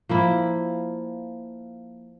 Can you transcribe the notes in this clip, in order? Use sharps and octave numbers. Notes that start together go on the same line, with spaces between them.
F3 A#3 E4